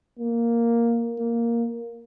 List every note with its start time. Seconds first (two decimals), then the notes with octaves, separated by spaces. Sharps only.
0.20 A#3
1.19 A#3